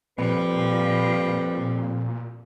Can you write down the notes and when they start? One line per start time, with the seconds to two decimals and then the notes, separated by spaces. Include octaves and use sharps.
0.18 F2 A#2 F3 G3 B4